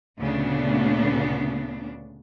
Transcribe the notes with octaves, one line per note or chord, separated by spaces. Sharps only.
D2 A#2 C#3 B3 D4